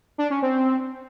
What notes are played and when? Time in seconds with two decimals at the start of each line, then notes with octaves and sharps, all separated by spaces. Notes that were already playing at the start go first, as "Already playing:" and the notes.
0.18 D4
0.30 C#4
0.42 C4